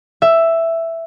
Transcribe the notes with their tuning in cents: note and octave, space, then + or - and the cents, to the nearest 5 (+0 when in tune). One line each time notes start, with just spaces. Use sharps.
E5 +5